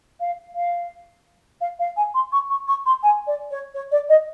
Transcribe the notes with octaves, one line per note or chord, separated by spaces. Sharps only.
F5
F5
F5
F5
G#5
C6
C#6
C#6
C#6
C6
G#5
D5
C#5
C#5
D5
D#5